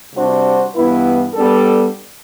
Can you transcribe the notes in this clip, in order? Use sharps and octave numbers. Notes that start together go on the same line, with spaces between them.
C3 G3 D4 F#4 C5
G2 E3 B3 E4 B4
G3 B3 D4 A4